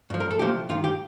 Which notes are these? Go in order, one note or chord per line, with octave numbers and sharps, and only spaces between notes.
G2 F3
A#4
A4
C2 A#2 F3 G4
G2 D#3 F4
G4